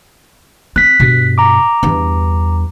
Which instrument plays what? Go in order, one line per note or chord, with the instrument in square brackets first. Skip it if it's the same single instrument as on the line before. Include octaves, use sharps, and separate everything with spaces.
[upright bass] C4 [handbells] F#6 B6
[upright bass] G2 B2
[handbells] A#5 D6
[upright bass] E2 G2